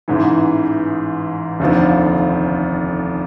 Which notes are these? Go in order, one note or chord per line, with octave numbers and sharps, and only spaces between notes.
A1 G#2 E3
F1 D#2 D3 F3